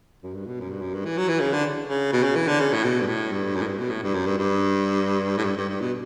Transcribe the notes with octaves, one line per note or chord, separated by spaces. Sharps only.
F#2
G2
B2
F#2
G2
F#2
G2
E3
F#3
E3
C#3
D3
C#3
B2
C#3
E3
D3
C#3
A2
B2
G2
A2
G2
F#2
A2
G2
B2
A2
G2
F#2
G2
G2
A2
G2
G2
G2
B2